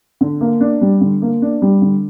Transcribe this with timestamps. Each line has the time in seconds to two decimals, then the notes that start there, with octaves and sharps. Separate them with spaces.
0.21 D3
0.41 A#3
0.61 D4
0.81 G3
1.01 D3
1.22 A#3
1.42 D4
1.62 G3
1.82 D3